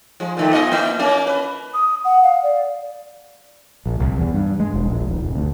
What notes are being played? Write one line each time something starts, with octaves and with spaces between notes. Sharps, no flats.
F3 G#3
A#2 D#3 A3
B3 F4 D#5
A#3 E4
A#3 C#4
B4
D#6
F#5
F5
D5
A#1
C2
E2
G2
G#3
E1
A#1
D#1
F1
D2